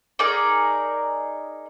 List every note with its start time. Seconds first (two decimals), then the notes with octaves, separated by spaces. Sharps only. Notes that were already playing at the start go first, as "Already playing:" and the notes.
0.19 D#4 G#4 A#4 D5